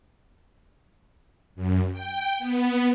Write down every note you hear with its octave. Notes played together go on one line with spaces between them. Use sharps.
F#2
G5
B3